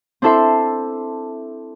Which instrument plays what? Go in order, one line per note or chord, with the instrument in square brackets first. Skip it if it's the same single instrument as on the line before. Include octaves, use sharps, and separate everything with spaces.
[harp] C4 D4 E4 A4 E5 C6